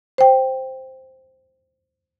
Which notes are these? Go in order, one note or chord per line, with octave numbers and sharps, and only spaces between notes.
C5 G5